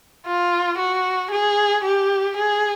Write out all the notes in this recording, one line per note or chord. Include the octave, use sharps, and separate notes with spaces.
F4
F#4
G#4
G4
G#4